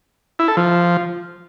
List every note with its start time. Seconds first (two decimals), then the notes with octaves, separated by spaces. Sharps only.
0.39 E4
0.48 A4
0.57 F3